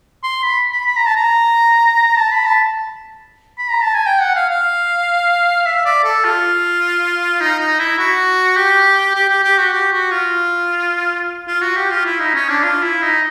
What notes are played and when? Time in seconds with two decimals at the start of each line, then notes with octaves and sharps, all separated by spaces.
0.23 C6
0.43 B5
0.72 B5
0.86 B5
0.96 A#5
1.06 A5
1.16 A#5
2.17 A5
2.31 B5
2.46 A5
3.58 B5
3.70 A#5
3.82 A5
3.94 G#5
4.06 G5
4.21 F#5
4.35 F5
4.50 F5
5.66 E5
5.85 D5
6.04 A4
6.24 F4
7.41 D#4
7.60 D#4
7.79 E4
7.98 F#4
8.57 G4
9.15 G4
9.29 G4
9.43 G4
9.58 F#4
9.73 G4
9.92 F#4
10.11 F4
11.48 F4
11.61 F#4
11.76 G4
11.91 F4
12.05 E4
12.20 D#4
12.34 C#4
12.49 D4
12.64 F4
12.82 E4
13.02 D#4